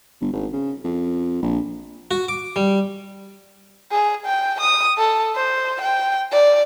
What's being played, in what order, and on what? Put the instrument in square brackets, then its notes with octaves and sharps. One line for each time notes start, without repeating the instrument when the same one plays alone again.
[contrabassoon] G1
G#1
C#3
F2
A#1
[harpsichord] F#4
D6
G3
[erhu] G#4
G5
D#6
A4
C5
G5
D5